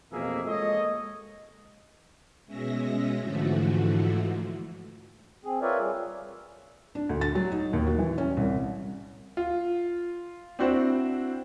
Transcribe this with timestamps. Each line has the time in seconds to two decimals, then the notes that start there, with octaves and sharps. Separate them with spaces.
0.12 A1 F2 B2 A#3 G#4 E5
0.46 G#3 A#3 A4 C#5 D#5
2.46 B2 G#3 C#4 E5 A#6
3.19 G#2 D3 E3 F3 A3 F#4
5.45 C4 G#4
5.62 F4 A#4 B4 C#5 D5 E5
5.78 G3 G#4
6.95 D4
7.09 D2
7.21 A6
7.35 F#3
7.52 D#4
7.73 D#2
7.86 F#4
7.99 E3
8.18 C#4
8.37 C2
9.37 F4
10.59 C4 D4 E4 F#4 C5